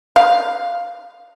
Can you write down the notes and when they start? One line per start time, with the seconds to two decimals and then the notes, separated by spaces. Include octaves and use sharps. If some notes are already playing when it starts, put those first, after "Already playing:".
0.16 F5